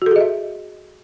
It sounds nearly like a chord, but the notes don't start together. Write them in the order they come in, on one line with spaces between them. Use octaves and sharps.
F#4 A4 G#4 D#5 E5